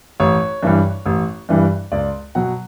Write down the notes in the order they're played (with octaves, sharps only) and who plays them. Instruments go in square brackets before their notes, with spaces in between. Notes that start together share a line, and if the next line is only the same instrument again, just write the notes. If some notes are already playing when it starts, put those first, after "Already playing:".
[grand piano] A1 C#5
G2 E3 G3
A1
G2 E3 G3
C#2 D5
B2 F#3 F#5